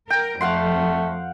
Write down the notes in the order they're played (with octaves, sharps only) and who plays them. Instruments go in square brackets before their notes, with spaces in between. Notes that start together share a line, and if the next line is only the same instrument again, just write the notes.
[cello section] A#4 [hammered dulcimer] G5
[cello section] F2 [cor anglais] A3 [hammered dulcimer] F5 F#5 C6